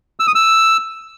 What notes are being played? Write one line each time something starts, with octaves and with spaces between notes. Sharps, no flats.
E6
D#6
E6